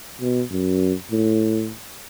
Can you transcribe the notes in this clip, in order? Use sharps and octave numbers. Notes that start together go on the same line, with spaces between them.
B2
F#2
A2